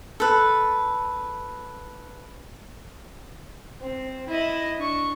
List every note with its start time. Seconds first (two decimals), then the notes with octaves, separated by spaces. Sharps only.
0.20 A4 B4
3.81 C4
4.28 E4 D#5
4.77 D4 C#6